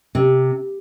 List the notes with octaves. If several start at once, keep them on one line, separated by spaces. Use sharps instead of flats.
C3